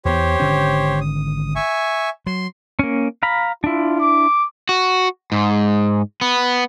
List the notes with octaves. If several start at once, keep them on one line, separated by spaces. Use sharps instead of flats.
E2 B3 G4 C5 C#5
G#1 D3 C#4
D#6
E5 G#5 C#6
F#3 C6
A#3 C#4
F5 A#5 B5
D4 E4 F4
D6
F#4
G#2
B3